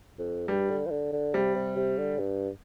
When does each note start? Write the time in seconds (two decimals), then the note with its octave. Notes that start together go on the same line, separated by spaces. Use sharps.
0.19 F2
0.47 G2 G3
0.70 D3
0.86 F3
0.91 D3
1.13 D3
1.34 C3 G3
1.55 C3
1.76 C3
1.98 D3
2.19 G2